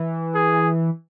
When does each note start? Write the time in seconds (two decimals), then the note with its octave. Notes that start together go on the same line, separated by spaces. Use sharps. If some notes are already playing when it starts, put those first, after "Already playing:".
Already playing: E3
0.35 G#4